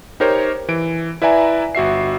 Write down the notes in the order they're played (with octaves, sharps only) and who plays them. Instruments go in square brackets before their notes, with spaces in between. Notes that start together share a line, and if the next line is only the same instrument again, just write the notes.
[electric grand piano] D#4 G4 A#4 C5 C#5
E3 D7
E4 B4 D5 E5 G#5 A#5
G1 F#4 E5 C7